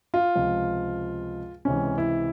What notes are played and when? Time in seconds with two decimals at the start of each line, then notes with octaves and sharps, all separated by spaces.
0.14 F4
0.35 C#2 C3 F3
1.65 C#2 C3 E3 C#4
1.98 E4